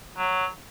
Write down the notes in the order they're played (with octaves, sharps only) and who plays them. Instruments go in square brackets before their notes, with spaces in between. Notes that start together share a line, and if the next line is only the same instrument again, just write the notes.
[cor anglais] F#3